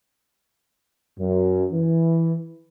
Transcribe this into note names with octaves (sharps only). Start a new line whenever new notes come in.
F#2
E3